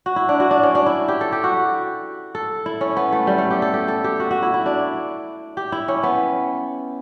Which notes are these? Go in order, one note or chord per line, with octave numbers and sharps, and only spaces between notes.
F#4
E4
D4
F#4
D4
C#4
D4
E4
G4
A4
G4
F#4
A4
E4
C#4
B3
A3
G3
A3
G4
A4
G4
A4
G4
F#4
F#4
E4
E4
D4
G4
E4
C#4
B3